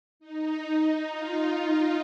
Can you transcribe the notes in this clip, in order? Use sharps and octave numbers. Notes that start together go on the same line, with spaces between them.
D#4
D#4
F4